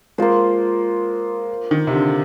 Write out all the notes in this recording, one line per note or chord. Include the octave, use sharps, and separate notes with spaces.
G#3 A#3 F4 C5
D#3
C3
D3